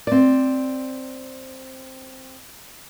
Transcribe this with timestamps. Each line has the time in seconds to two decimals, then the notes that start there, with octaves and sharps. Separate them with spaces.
0.07 C4 D5